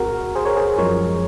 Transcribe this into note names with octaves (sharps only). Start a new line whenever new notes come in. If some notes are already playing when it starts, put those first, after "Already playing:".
Already playing: C2 A#2 C4 F#4 G#4 A#4
G#4 C5
A#4 C#5
G#4 C5
F#2 F3 G#3 A#4 C#5